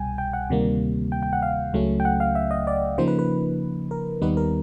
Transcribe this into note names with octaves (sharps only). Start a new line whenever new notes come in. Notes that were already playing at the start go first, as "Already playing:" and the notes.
Already playing: C2 B2 G3 G5 G#5
G5
F#5
D2 C3 D#3 G3 A#3
G5
G5
F#5
F5
C#2 C#3 F#3 A3 C#4
G5
F#5
F5
E5
D#5
D5
C#3 F3 A#3 D#4 C5
B4
B4
A#4
D#2 D#3 G3 B3 D#4 B4
A#4